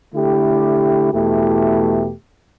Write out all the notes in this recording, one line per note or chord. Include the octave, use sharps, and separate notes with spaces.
D3 A3 E4 G4
E2 B2 A3 E4 G4